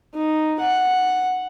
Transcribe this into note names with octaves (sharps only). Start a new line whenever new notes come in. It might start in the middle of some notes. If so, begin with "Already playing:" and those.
D#4
F#5